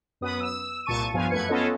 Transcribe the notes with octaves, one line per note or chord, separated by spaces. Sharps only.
F#2 B3 B4 D#6
E6
C2 A#2 A5 C#6 D#7
G2 F3 B3 F5 G#5
F#2 A3 B4 G#6 C#7
B3 C#4 F4 A4 C#5 D#5